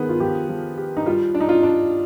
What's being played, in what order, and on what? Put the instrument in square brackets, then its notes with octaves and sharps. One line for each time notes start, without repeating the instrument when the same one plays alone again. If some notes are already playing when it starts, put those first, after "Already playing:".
Already playing: [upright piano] D#3 B3 [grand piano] G#4
[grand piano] F4
[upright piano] F3 [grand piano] G4
[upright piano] F3
G4
[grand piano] D#4
[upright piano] G3 [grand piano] F4
[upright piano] D4
[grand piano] D#4
F4
[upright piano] D4